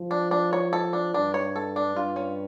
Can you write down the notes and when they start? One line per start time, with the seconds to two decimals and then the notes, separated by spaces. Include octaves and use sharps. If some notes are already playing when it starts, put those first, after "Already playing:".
Already playing: F3
0.11 D4
0.31 D4
0.53 C#5
0.73 A4
0.93 D4
1.14 G2 D4
1.34 C#5
1.56 A4
1.76 D4
1.96 G2 F4
2.16 C#4